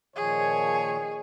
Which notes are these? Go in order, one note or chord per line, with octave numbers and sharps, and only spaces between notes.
A#2 D#3 F3 G#4 C#5